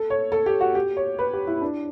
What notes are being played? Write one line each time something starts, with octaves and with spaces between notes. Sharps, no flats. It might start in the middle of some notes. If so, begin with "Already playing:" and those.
Already playing: A4
C#5
A4
G4
F#4
G4
C#5
B4
G4
E4
D4